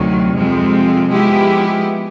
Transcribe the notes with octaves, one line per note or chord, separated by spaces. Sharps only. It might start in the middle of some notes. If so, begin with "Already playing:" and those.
Already playing: D2 C3 D#3 F#3
F2 C3 F3 G#3 C4
F3 G#3 B3 E4 G4